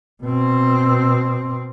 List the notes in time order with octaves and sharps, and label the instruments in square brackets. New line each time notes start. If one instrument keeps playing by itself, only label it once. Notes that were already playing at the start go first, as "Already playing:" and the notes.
[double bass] B2 C4